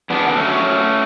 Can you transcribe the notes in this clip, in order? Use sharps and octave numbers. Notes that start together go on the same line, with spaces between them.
E2 B3 D4
D3 B3
A3 C#4
F#3
F#3